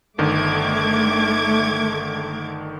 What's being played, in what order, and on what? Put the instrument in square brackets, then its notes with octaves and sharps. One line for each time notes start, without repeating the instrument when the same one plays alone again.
[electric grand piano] G1 D3 D#3 [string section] A3 D6 G#6